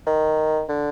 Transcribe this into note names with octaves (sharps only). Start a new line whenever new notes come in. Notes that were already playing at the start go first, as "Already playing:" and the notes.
D#3
D3